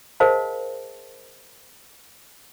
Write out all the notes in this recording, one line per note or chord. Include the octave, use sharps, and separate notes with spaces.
G#4 A#4 C5 D#5 F5 A5